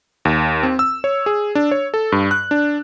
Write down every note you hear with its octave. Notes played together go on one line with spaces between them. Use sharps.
D#2
C4
E6
C#5
G#4
D4
C#5
A4
G2
F#6
D4